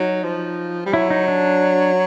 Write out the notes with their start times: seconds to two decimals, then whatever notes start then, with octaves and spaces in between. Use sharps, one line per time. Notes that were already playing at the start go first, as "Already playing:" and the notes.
Already playing: F#3 D#4
0.23 F3
0.86 G3
0.93 F#3 E4
1.10 D#4
1.28 D4